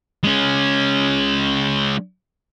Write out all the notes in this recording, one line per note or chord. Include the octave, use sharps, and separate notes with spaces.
G#3 C#4